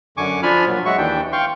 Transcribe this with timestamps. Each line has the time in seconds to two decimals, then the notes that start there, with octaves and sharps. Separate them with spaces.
0.17 F#2 D3 G#5 C#6 D6
0.43 F3 D4 F4 G#5 B5 F6
0.66 A#2 F#3
0.86 F#3 G#3 F#4 E5 C#6
0.98 D#2 E3 D4 G5
1.32 F5 G5 C6 C#6